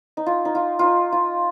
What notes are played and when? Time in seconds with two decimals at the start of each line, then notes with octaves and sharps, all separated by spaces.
0.17 D#4
0.26 F4
0.45 D#4
0.55 F4
0.79 D#4 F4
1.12 F4